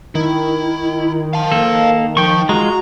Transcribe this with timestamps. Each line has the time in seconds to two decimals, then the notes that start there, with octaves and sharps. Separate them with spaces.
0.15 D#3 E4
1.33 F5 A5
1.52 A#3 A4
2.17 F3 G5 C#6
2.49 G#3 F4 F#4 A#5